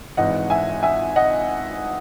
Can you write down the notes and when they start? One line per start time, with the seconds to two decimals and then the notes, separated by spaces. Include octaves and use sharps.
0.17 G#1 G#2 E3 D#5 F#5
0.50 E5 G#5
0.83 E5 G#5
1.16 D#5 F#5